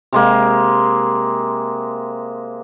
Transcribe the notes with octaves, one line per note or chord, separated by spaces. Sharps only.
C3 G#3 A#3